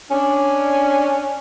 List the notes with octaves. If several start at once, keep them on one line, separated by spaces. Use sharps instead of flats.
C#4 D4